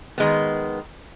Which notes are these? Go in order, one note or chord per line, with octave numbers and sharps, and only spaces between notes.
D#3 G#3 B3